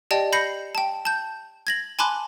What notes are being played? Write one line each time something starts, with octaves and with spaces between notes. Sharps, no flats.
G4 D5 D#5 G5 A5
B5 G6 A#6 C7 C#7
G5 A5
A5 G6
G#6 A#6 F#7
G#5 A5 B5 C6 D6 F#6